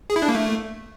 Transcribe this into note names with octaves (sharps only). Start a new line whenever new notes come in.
G#4
E4
D4
A#3
A3